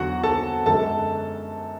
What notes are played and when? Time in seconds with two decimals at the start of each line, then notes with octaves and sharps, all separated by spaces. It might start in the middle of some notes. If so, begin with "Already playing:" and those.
Already playing: E2 D3 F#3 B3 F#4 F#5
0.23 A4 A5
0.66 F#2 D3 G#3 A4 A5